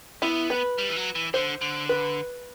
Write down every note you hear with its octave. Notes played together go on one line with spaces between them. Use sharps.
B3 E4
B4
G3
E3
F#3
E3
D3 C5
D3
B4